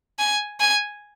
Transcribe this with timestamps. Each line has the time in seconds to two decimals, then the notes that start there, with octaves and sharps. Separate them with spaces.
0.19 G#5
0.60 G#5